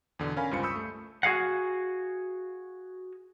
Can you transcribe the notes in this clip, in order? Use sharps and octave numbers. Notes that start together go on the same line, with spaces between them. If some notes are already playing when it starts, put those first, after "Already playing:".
E2 B2 D3
C#4 A#4 F5 G#5 B5
C#2 G2 F4 C5 C#7
B5 C#6 D#6 E6 G6
A3
F#4 G#4 F5 F#5